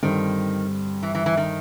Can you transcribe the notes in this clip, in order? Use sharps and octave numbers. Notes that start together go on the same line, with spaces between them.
G2 D3 D#3 G3 C4
E3
E3
E3
D#3